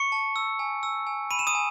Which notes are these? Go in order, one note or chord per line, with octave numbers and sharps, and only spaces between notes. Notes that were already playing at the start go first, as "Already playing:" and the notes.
Already playing: C#6 C#7
A5
E6
G#5
E6
G#5
B5 D#7
E7
D#6 D#7
G#5